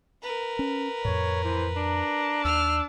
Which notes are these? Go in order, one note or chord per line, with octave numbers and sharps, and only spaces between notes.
A#4 B4
C#4
F2 A2 C#5
E3 C5
D4 A#5
D#2 E6 F6